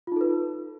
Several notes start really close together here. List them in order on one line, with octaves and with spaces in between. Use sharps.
F4 D#4 A4 B4